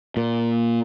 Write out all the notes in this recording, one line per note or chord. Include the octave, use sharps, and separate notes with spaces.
A#2